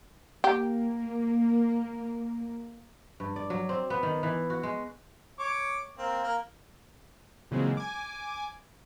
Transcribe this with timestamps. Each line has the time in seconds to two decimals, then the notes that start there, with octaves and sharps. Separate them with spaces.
0.44 A#3 G4
3.20 G2
3.36 D5
3.50 F#3
3.69 C4
3.90 B3
4.03 D#3
4.23 E3
4.50 F#4
4.63 G#3
5.39 C#5 D6
5.98 A#3 C4
6.23 A#3
7.51 A#2 C#3 E3 F#3 G#3 C4
7.77 G#5 D6